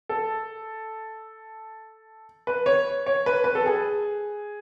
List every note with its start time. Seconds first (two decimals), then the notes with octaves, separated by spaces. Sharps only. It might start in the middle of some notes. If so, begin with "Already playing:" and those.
0.09 A4
2.47 B4
2.66 C#5
3.06 C#5
3.26 B4
3.44 B4
3.55 A4
3.66 G#4